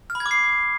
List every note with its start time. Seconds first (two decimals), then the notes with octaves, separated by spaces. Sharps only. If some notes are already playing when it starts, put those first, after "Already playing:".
0.10 F6
0.15 B5
0.20 G#6
0.26 D6
0.31 C7